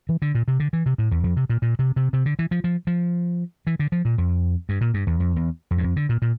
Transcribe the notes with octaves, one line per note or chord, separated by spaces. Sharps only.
E3
D3
A#2
C3
D3
E3
C3
A2
E2
F2
C3
A#2
A#2
C3
C3
C3
D3
E3
F3
F3
F3
E3
D3
F3
A#2
F2
G2
A#2
G2
E2
F2
E2
F2
G2
F2
D3
A#2
A#2